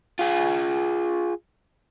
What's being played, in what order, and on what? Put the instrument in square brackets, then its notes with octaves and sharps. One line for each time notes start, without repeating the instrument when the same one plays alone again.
[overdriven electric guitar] F4 G#4